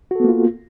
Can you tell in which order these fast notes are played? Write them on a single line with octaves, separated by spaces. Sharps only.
F#4 A4 B3 A#3 F4